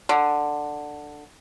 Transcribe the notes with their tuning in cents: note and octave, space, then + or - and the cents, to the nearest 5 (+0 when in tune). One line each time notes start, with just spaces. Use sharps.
D3 +10